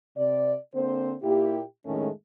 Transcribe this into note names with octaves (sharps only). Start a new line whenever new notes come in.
C3 D5
D3 A#3 C4 C5
A#2 A#3 E4 G4
F2 A2 D#3 G#3 A3 C#4